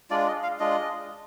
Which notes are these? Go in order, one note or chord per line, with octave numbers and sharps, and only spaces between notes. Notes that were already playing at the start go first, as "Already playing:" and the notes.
G#3 D4 F4 D5
D#5
F5
G#3 D4 F4 D#5